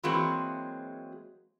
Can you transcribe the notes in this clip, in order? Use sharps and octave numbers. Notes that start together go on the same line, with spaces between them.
E3 F#3 G#3 A#3 C4 F#4